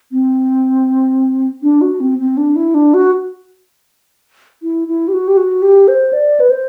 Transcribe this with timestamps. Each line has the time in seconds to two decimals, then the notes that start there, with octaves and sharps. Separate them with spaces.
0.12 C4
1.63 D4
1.81 F#4
2.00 C4
2.19 C4
2.37 D4
2.56 E4
2.74 D4
2.94 F#4
4.63 E4
4.88 E4
5.08 G4
5.13 F#4
5.28 G4
5.37 F#4
5.62 G4
5.88 C5
6.13 D5
6.40 B4
6.50 C5